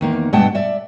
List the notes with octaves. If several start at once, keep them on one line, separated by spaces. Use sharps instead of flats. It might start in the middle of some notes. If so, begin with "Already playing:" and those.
E2 D#3 A#3
G2 B2 G#3 F#5 G5 A5
D5 E5